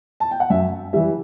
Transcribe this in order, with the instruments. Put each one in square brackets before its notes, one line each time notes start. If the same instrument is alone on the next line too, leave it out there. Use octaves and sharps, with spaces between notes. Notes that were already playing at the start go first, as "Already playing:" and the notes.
[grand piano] A5
G5
F#5
F#2 E5
E3 G3 E5